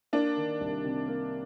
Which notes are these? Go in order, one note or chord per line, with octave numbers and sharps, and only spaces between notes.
A#3 D4
D#3
C2
C3
A#3